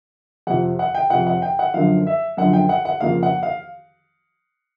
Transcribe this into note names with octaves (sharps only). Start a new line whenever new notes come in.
F2 C3 F3 F#5
F#5
G5
F2 C3 F3 F#5
F#5
G5
F#5
F#2 D3 F3 F5
E5
F#2 D3 F3 F#5
G5
F#5
F#5
F2 C#3 F3 A#3 F5
F#5
F5